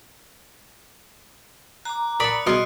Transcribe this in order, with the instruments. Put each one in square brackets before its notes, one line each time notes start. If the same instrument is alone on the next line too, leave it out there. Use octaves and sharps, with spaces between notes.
[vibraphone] A#5 D6 [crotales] F#6
[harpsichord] A#4 A5 [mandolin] D5 B5 [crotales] D#6 F#6 C#7
[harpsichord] B2 G3 G#4 [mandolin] D#5 C6 [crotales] F6 F#6 D7